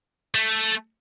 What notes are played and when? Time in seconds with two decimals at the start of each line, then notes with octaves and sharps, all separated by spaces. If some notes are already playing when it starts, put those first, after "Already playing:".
0.35 A3